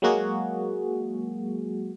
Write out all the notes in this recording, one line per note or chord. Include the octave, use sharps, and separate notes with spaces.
F#3 G#3 A#3 F#4 G#4